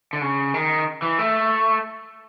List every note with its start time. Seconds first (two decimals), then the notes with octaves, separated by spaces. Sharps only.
0.13 D3
0.22 C#3
0.54 D#3
1.02 E3
1.19 A3